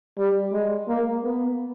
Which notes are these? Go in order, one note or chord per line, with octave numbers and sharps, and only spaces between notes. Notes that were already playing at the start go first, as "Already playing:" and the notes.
G3
G#3
A#3
B3